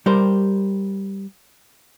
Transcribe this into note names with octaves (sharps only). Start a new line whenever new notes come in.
G3 G4 A#4 C5